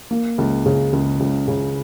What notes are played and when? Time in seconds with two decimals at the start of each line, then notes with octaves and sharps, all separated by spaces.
0.11 A#3
0.38 C#2
0.66 C#3
0.93 C#2
1.20 C#2
1.48 C#3